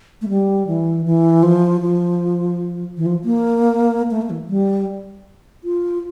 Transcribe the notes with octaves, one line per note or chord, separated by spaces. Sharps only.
A3
G3
E3
E3
F3
F3
E3
F3
A#3
A3
A#3
E3
G3
F4